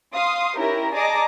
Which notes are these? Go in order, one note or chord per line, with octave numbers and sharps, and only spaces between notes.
F5 C6 D#6
C#4 D#4 E4 G4 A#4 A#5
G#4 D5 D#5 A5 A#5 D6